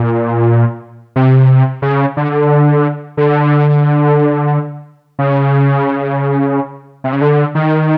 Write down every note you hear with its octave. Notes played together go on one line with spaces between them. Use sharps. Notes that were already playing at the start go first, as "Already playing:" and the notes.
Already playing: A#2
C3
C#3
D3
D3
C#3
C3
C#3
D3
D#3